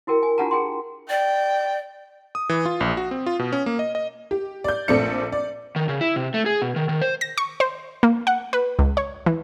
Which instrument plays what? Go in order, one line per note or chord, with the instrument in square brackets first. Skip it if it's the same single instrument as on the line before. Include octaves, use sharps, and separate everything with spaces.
[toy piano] E4 F#4 A#4 G5
G#5
D4 F4 G4 F#5 A5 A#5
G#4 G5 C6
[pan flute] D5 [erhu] G5
[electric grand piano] D#6
E3
F4
A#1
F#4
C4
F4
B2
C#4
A#3
D#5
D#5
[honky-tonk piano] G4
D5 G6
A#1 A3 C4 D5 C#7
D5
[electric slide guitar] D#3
C#3
E4
C3
A3
G#4
B2
D#3
D#3
C5
[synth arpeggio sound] A#6
C#6
C5
A#3
F#5
B4
C#2
C#5
E3